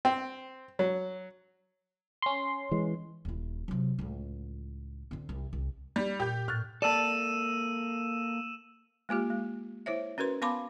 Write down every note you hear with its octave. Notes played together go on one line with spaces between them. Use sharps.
C4
F#3
C#4 C6
E3 G#3
D#1 E4
C3 F#3
C#2 A2
D3 C4
C2
C2
G3
A#2 G4 G6
A2 F6 F#6 A6
A#3 A4 D5 A5 E6 D#7 E7
G#3 A#3 F4 G4
G#3
E4 C5 C#5 E5
C#4 F#4 A#4 B4 C6
B3 F5 A5 B5 C6 D6